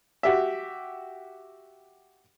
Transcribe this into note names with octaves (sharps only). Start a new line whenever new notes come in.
F#4 G4 E5